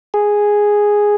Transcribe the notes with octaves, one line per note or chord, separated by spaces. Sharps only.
G#4